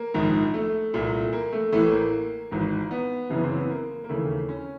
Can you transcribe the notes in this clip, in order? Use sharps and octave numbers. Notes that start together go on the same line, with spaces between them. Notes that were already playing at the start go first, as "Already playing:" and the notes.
Already playing: A#3
A#1 G#2 D#3
A3
C2 A#2
A#3
A3
A1 A2 E3 A3
A#3
G#1 G#2 E3
B3
F#1 F#2 C#3 E3 B3
C4
B3
A#3
A#3
D#2 C#3 E3 A3
C#4